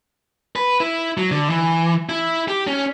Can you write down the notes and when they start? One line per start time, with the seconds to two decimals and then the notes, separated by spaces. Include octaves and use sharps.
0.56 B4
0.80 E4
1.17 F#3
1.31 D3
1.50 E3
2.09 E4
2.48 G4
2.67 C#4